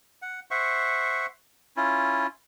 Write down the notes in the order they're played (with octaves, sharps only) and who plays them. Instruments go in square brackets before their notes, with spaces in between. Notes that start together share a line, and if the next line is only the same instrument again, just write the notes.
[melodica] F#5
C5 E5 F#5 C#6
C#4 E4 F4